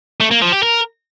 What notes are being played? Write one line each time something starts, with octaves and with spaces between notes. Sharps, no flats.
A3
A#3
F3
G4
A#4